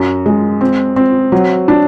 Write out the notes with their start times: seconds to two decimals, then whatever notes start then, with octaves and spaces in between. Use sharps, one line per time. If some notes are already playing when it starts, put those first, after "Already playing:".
Already playing: F#2
0.26 G#3
0.61 C4
0.96 C4
1.32 F#3
1.68 D4